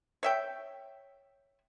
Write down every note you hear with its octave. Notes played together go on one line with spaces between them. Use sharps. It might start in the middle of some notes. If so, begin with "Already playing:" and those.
C#5 E5 G5